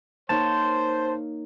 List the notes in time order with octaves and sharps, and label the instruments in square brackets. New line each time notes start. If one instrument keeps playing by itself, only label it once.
[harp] A#3 D#4 C#5 [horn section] C5 [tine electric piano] A5